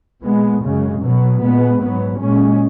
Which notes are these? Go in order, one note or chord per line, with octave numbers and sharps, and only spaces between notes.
A#2 G#3 B3
F#2 C#3 G#3
B2 F#3 B3
A#2 G#3 B3
G#2 F#3 B3
A#2 G#3 C#4